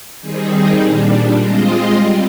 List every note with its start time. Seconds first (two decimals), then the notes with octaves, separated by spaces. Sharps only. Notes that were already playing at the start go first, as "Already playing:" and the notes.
0.20 D#3 G3 C4 D#4 G#4
0.79 A#2 G3 D4
1.38 G#3 C4 F4 C5 D#5
1.96 G3 C4